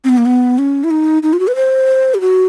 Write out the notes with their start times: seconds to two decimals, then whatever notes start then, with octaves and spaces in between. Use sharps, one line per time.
0.04 C4
0.09 B3
0.18 A#3
0.26 B3
0.58 C#4
0.84 E4
0.91 D#4
1.23 D#4
1.33 F4
1.40 F#4
1.48 B4
1.56 C5
2.14 G4
2.21 F#4